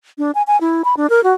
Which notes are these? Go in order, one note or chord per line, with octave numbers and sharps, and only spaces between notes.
D4
G#5
G#5
E4
B5
D4
A#4
F#4